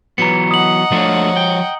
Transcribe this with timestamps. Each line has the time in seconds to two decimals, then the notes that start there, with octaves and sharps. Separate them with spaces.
0.18 E3 F#3 B3 A#5 C#7
0.51 D#5 F#5 D#6 F#7
0.92 F3 A3 D4 F4 C#5
1.37 G5